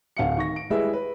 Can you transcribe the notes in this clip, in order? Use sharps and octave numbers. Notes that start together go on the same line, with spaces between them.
D1 F5 F#5 C#7
D#3 C#6 A#6
D7
G3 G#3 E4 G#4 B4 E5
B4